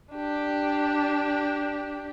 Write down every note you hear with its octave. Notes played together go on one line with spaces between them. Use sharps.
D4 G4